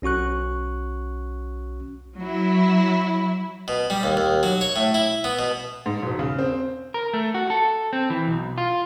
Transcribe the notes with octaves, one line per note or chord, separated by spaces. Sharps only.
B1 C#4 F#4 C#6 F#6
F#3 E4
B2
G3
D#2
D#2
F#3
C#5
A2
E4
B3
B2
G#2
E1
C#3
C4
A#4
A3
F#4
A4
C4
E3
B1
F4